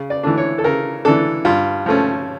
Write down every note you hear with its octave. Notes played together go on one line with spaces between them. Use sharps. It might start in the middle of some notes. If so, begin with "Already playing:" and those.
Already playing: C#3
D5
E3 A3 D4
C#5
A4
C#3 A#4
E3 A3 D4 A4
G2 F4
F3 A3 C#4